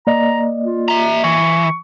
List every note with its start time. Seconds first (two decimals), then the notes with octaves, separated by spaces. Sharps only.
0.07 A#3 D5 D#5 A#5
0.64 F4
0.88 E5 A#5
1.24 E3 C#6